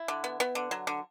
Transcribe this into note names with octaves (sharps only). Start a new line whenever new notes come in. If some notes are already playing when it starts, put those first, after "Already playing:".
Already playing: E4
D3
B3
B3
D3
F#3
D3